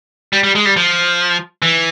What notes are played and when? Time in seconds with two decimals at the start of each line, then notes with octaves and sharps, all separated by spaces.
0.33 G3
0.44 G3
0.55 G#3
0.65 G3
0.77 F3
1.62 E3